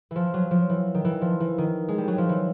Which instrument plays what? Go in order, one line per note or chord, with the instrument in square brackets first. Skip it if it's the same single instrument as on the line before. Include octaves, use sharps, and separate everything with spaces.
[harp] E3 F3
F#3
F3
E3
D#3
E3
F3
E3
D#3
G#3
G3
F#3
F3
E3